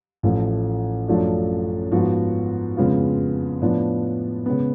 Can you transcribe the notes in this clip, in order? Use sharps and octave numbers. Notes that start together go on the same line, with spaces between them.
A1 A2 F3 A3
F#2 F3 A3 D4 F#4
G#2 F3 B3 F#4
F2 C#3 G#3 B3 F4
A2 F3 B3 D4
C#3 G#3 B3